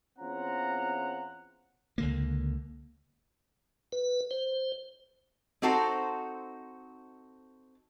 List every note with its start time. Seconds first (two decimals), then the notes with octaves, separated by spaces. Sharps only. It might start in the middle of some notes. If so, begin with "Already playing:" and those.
0.19 E2 C4 C#4 F4 F#5 A#5
1.98 C#2 D3 A#3
3.92 B4
4.31 C5
5.62 C4 D#4 F#4 A4 C5